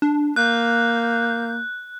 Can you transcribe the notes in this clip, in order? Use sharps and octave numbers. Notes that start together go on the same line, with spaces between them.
D4
A#3 F#6 G6